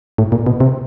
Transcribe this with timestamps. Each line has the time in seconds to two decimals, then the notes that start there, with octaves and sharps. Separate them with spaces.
0.18 A2
0.32 A#2
0.46 B2
0.60 C3